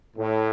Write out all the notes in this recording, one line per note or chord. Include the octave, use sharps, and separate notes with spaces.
A2